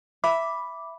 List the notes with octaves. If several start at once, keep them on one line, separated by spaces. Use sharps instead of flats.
E5 B5 D6